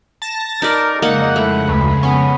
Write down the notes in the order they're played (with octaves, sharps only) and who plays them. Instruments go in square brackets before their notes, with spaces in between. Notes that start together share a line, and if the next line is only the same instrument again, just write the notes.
[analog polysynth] A5 A6 A#6
[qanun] D#4 B4 D5 [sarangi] A#4
[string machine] F2 C#3 G#3 [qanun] A#3 [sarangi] D#4 [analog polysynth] F#5
[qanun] A3 [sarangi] E4
[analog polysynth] D2 [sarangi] B4
[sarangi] B3 [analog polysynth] C#4